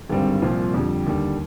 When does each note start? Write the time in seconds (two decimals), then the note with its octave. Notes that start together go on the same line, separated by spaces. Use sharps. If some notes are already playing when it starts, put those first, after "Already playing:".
0.10 G#1 G2 D3 G3 C4
0.42 C2 A#2 F3 C4 F4
0.74 F2 D3 G3
1.07 D#2 D3 G3